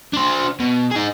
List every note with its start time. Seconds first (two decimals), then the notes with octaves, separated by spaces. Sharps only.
0.13 D4 C5
0.60 B2
0.91 D#4 G#4